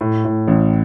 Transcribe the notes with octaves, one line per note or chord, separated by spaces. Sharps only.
A2
A2
A1